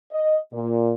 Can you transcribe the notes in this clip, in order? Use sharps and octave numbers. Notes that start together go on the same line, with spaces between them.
D#5
A#2